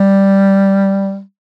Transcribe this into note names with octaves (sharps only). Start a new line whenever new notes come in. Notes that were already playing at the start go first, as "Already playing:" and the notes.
Already playing: G3